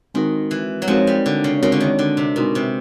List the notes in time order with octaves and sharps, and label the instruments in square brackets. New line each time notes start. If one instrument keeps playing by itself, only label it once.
[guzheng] D#3 [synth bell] G#3 C4 D#4 F#4 A#4
[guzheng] E3
F#3
[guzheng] F3 [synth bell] G#3 C4 D#4 F#4 A#4
[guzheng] G3
D3
C#3
[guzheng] C#3 [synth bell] G#3 C4 D#4 F#4 A#4
[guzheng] D3
D#3
D3
C3
[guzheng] B2 [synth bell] G#3 C4 D#4 F#4 A#4
[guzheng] C3